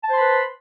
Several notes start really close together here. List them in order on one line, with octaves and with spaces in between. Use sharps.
A5 C5 C6 B5 B4